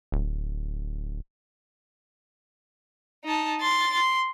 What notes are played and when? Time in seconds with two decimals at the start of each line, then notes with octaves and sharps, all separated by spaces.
0.12 D1
3.24 D#4 A5
3.61 C6 A6
3.93 C6